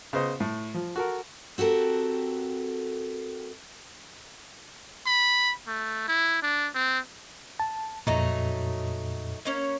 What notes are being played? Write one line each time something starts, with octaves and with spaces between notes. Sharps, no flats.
C#3 B3 C5 D#5
A2
F3
F#4 A4 A#4
C4 F#4 G4 A4 A#4
B5
A3
E4
D4
C4
A5
F2 A#2 F#3 A3 D#4
A#3 C#4 C#5